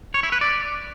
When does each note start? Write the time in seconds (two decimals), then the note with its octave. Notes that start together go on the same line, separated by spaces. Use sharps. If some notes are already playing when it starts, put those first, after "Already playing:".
0.14 C#5
0.23 E4
0.32 B4
0.41 D5